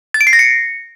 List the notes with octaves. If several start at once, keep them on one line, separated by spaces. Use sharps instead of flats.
A6
D7
C7
A#6
C#7